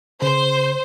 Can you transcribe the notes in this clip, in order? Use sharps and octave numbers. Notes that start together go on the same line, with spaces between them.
C#3 C5